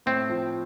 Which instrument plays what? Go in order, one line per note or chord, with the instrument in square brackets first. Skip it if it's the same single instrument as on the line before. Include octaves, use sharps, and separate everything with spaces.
[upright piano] A2 [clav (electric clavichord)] C4
[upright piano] F3